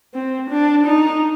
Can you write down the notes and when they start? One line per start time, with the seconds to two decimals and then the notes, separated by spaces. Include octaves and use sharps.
0.14 C4
0.50 D4
0.86 D#4